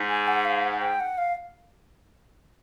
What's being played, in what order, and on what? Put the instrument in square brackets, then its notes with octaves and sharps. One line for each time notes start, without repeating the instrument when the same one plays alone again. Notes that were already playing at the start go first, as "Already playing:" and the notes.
Already playing: [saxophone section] G#2
[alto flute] G#5
F#5
F5
F#5
G5
F#5
F5